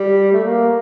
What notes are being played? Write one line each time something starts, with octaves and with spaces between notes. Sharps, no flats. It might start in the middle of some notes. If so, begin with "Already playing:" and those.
Already playing: G3
A3
A#3